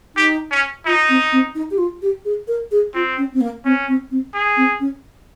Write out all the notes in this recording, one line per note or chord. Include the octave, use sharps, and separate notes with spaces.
D#4 G4
C#4
D#4 F4
C4
C4
D#4
G4
F4
G4
G#4
A#4
G#4
C4 F4
C#4
C4
A#3
C4 C#4
C4
C4
G#4
C4
C#4